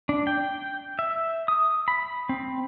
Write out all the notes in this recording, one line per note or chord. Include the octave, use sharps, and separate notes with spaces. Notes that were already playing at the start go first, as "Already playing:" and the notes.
D4
G5
E5
D#6
B5
C4